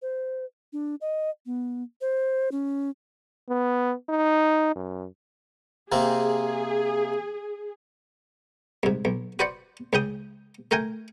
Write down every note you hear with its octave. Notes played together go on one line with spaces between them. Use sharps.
C5
D4
D#5
B3
C5
C#4
B3
D#4
F#2
C3 A#3 C4 G#4
C2 G#2
B1
F#4 B4 C5 D5 F#5
C#2 C#3 G5 D#6
A3 A#4 G5 G#5